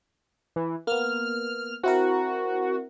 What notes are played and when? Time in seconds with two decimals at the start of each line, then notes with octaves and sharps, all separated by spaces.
0.56 E3
0.87 A#3 B3 F6
1.84 C4 E4 F#4 A#4